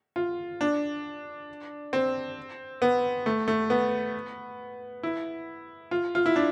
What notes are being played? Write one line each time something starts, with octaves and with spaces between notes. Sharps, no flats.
F4
D4
C4
B3
A3
A3
B3
E4
F4
F4
E4
D4